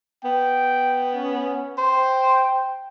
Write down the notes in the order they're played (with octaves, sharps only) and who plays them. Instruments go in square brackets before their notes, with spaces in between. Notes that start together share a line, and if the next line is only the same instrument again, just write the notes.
[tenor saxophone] B3 [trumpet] G5
[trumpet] C#4
[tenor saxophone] C5 [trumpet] G5